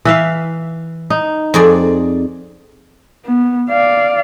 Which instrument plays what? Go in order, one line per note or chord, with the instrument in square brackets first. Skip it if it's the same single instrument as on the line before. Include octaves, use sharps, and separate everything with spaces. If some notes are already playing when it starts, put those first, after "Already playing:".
[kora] E3 E5 F5
D#4
[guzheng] F2 G#4 D5
[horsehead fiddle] B3
D5 F5